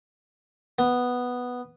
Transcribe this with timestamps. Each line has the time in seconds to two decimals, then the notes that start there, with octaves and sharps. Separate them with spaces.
0.79 B3